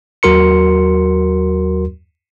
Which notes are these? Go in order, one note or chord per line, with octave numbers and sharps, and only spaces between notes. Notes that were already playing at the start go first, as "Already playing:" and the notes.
D#2 F#3 F#4 A#4 C6 C#7